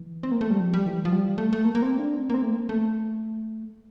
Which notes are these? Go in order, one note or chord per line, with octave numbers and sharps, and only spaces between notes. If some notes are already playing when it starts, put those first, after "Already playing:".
Already playing: E3
C4
A#3
A3
G3
F3
G3
E3
F3
G3
A3
A3
A#3
A#3
C4
D4
C4
A#3
C4
A3
A#3
A3